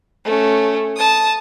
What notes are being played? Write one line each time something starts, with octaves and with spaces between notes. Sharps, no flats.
A3 C#4
A5 D#6